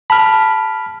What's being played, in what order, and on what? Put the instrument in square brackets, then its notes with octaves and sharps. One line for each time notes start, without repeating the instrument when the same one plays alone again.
[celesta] A5 [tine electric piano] B5 F6